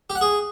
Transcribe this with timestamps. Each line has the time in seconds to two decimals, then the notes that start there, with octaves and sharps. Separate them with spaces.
0.10 G4
0.15 F#5
0.21 G#4